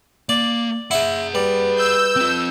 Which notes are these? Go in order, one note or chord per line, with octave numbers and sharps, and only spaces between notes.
A#3 D5
E4 G#4 E5 F#5
G3 B4
E6 G6
C4 F4